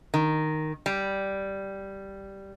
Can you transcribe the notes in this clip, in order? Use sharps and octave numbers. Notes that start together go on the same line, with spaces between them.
D#3
G3